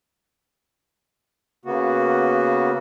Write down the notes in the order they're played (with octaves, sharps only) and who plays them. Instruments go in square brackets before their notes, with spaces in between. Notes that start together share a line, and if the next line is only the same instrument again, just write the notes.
[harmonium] C#3 A#3 B3 F#4